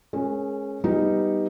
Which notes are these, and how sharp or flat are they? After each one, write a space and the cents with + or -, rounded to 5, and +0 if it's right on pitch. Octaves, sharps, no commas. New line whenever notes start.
G#3 +15 C#4 -15 A#4 +0
G3 +0 B3 +0 D#4 +0